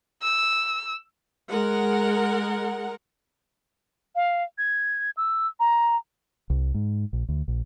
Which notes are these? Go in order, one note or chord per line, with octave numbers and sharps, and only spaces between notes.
E6
G#3 A#4 F#5
F5
G#6
E6
A#5
C2
G#2
A#1
D2
A#1